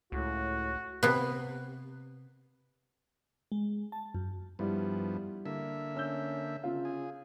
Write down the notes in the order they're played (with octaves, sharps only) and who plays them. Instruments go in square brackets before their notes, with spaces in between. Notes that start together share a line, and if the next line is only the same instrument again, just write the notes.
[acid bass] C#2 [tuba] A2 [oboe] F#4
[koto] C3 B3
[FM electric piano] G#3
A5
F#2
[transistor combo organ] G2 F3 B3 [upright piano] G3 E4
[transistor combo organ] D3 A#3 E5
[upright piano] C#4 E6 G6
C#3 F4
[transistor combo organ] G#4